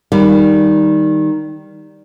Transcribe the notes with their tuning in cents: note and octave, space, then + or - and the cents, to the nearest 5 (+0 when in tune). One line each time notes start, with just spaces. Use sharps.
D#3 +0 G3 +0 B4 +20